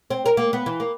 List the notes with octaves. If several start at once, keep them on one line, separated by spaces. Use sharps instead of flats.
C4
A#4
A#3
B3
E3
A#3